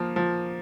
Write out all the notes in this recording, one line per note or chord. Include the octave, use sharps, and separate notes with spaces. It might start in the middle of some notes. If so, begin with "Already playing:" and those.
Already playing: F3 A#3
F3